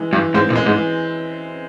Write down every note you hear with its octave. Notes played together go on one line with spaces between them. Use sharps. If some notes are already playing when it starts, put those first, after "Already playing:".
Already playing: E3 G#3
G2 E3
G#2 C4
A#2
G#3
G#2
E3